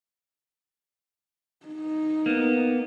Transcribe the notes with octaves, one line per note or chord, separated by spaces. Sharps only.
D#4
A#3 B3